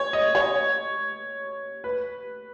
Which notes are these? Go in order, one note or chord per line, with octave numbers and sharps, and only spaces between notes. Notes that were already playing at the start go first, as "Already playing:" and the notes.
Already playing: C#5
D#5
C#5
B4